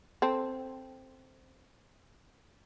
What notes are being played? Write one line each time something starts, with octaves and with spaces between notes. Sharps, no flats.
C4 A4